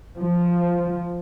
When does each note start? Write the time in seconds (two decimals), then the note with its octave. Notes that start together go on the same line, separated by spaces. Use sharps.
0.18 F3